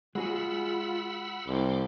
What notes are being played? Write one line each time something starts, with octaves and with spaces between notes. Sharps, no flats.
G#3 F4 F#4 G#4 F#5 B5 E6
C2 C6 D6